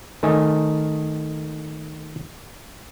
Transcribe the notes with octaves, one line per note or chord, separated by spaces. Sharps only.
D#3 A3 D#4 G#5